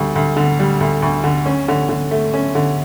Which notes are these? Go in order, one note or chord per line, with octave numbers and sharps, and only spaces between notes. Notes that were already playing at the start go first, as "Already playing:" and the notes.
Already playing: D2 G3
D2
D3
G3
D2
D2
D3
C#4
D3
D3
A3
C#4
D3